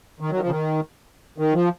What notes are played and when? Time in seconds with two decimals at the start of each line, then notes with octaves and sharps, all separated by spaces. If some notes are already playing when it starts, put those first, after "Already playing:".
0.20 D#3
0.30 F#3
0.36 D#3
0.40 F3
0.46 C#3
0.50 D#3
1.38 D#3
1.54 F3